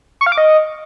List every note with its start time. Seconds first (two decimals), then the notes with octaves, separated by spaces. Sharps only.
0.21 C#6
0.26 F5
0.32 D6
0.38 D#5